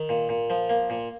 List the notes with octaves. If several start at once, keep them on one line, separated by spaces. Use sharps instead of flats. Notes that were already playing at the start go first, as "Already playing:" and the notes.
Already playing: D#3
A#2
A#2
F3
A#3
A#2